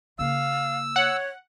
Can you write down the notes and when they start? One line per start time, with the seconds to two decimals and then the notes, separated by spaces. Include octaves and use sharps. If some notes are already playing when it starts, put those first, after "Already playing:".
0.19 C#3 A#3 F5 E6
0.96 C#5 F#5